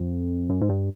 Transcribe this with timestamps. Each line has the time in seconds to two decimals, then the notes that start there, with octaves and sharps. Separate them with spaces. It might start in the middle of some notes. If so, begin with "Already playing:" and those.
Already playing: F2
0.50 F#2
0.61 G#2
0.69 G2